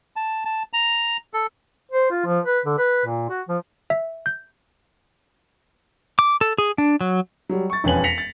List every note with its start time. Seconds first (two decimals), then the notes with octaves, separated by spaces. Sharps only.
0.16 A5
0.45 A5
0.73 A#5
1.34 A4
1.91 C5
2.10 F4
2.25 F3
2.45 B4
2.65 D3
2.78 B4
3.06 A#2
3.30 F#4
3.48 F3
3.90 E5
4.26 G6
6.19 D6
6.41 A4
6.58 G#4
6.78 D4
7.01 F#3
7.49 F#3 G3
7.70 C#6 A6
7.84 E1 F2 C#4 B4 G#5 F#7
8.04 A#6 B6 C#7 F7
8.18 A6